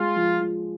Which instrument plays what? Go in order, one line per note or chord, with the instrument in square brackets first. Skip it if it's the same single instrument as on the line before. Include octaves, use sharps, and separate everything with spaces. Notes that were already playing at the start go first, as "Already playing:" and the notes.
Already playing: [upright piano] G#3 [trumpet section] F4
[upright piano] F3
F3